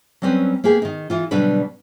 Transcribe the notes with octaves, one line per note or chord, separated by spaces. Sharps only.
F#3 G3 C4 C#4 B4
A#3 B3 G4 G#4
D#3 D#4
E3 F4
B2 D3 F#3 G3 D4 B4